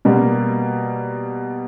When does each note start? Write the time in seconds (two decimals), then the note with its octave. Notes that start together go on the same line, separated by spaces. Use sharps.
0.05 B2 G3 A#3